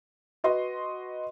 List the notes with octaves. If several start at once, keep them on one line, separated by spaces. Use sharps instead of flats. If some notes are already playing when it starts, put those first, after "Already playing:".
F#4 B4 D#5 C6